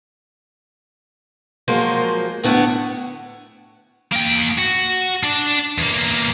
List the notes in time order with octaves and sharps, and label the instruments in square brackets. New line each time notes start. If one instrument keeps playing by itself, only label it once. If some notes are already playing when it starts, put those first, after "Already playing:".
[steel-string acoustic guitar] F3 F#3 G#3 A#3 F4 C5
D2 A2 B3 D4 E4 F#5
[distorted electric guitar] A#3 G5
F#4
D4 D5
E2 A#3